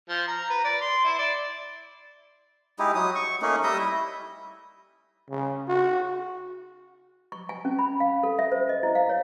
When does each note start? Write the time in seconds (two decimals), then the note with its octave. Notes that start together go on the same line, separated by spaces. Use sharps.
0.09 F3
0.27 A#5
0.50 B4
0.64 D5
0.81 C6
1.04 E4
1.18 D5
2.79 G#3 D#4 E4 G4
2.95 F#3 D#6
3.15 C#6
3.42 A3 A#3 C#4 D#4
3.64 G3 D#5 E5 D#6
3.79 E4
5.30 C#3
5.69 F#4
7.32 C#6
7.49 G#5
7.65 C#4
7.79 B5
8.00 F5
8.23 A4
8.39 E5
8.52 C5
8.69 D#5
8.83 E4
8.95 F5
9.09 C#5